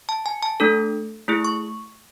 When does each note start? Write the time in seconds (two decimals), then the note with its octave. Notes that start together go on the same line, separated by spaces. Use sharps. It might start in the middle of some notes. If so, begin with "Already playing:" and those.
0.09 A5
0.26 G#5
0.43 A5
0.60 A3 D4 A4
1.28 A3 E4 G#4
1.45 C#6